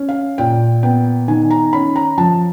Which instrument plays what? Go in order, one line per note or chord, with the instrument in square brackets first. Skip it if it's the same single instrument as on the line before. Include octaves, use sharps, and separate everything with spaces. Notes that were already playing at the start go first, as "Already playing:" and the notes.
Already playing: [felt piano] C#4
F5
A#2 G5
B3 G5
D#3 G#5
A#5
C#4 B5
A#5
F3 A5